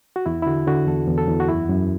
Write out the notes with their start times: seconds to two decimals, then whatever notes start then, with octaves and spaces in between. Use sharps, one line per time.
0.16 F#4
0.26 E2 E4
0.42 E4
0.47 D3 F#4
0.67 D3 F#4
0.87 E2 A4
1.08 E2
1.18 A4
1.28 E2
1.40 F#4
1.48 F#2 E4
1.70 F#2